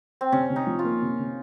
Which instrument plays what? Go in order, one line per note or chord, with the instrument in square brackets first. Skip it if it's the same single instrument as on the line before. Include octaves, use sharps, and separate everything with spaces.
[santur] C4
[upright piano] C3 [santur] C#4
[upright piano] C3
[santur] D#4
[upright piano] F3
[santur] F4
[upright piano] A#3
C3
C3